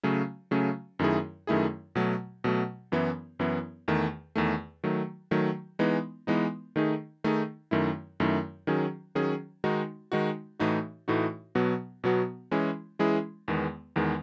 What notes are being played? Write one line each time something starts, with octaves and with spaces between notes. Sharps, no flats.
C#3 F#3 A3 C#4
C#3 F#3 A3 C#4
F#2 D#3 A3 E4 G#4
F#2 D#3 A3 E4 G#4
B2 F#3 A3
B2 F#3 A3
F#2 E3 B3 E4
F#2 E3 B3 E4
E2 D#3 A3
E2 D#3 A3
D#3 F#3 A3
D#3 F#3 A3
E3 G#3 B3 D#4
E3 G#3 B3 D#4
D#3 A3 D#4 G#4
D#3 A3 D#4 G#4
F#2 D#3 A3 E4
F#2 D#3 A3 E4
D#3 F#3 C#4 G#4
D#3 F#3 C#4 G#4
D#3 G#3 D#4 F#4
D#3 G#3 D#4 F#4
A2 E3 A3 D#4 F#4
A2 E3 A3 D#4 F#4
B2 F#3 B3 F#4
B2 F#3 B3 F#4
E3 G#3 C#4 E4 G#4
E3 G#3 C#4 E4 G#4
E2 D#3 G#3 B3
E2 D#3 G#3 B3